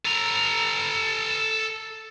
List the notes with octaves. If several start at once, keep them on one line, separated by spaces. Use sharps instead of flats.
A4 A#5